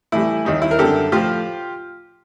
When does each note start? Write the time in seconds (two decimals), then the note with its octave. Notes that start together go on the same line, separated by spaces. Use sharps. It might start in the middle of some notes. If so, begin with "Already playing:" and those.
0.12 A2 E3 G3 E4
0.45 D#2 D#3 G3 D#4
0.62 E4
0.71 A#4
0.78 F#2 D3 G3 G4 A4
1.12 A2 F3 F4 G4